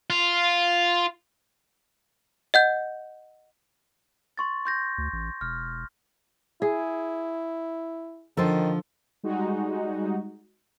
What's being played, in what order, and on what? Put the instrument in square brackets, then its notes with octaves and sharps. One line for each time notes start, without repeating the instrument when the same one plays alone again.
[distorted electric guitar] F4
[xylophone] D#5 F#5 G6
[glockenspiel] C6 C#6 A6
C6 G6 A#6
[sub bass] D2
A1
[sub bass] E1 [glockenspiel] F6
[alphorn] E4 [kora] G#4
[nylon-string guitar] D3 F3 [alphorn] D#3 [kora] A4 C5
[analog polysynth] G3 G#3 D#4 F#4